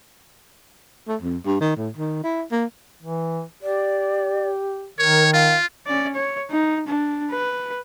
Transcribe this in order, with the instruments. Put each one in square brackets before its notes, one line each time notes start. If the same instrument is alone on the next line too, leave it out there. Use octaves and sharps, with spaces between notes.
[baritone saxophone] A3
F2
G2
D#3
A2
D#3
E4
A#3
[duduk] E3
[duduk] G4 [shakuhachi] D5
[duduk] D#3 [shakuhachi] A#4 [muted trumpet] C#5
[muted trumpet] F4 [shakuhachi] F5
[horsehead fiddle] C#4 D5
C#5
D#4
D4
B4